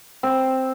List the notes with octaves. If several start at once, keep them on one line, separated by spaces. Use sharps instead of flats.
C4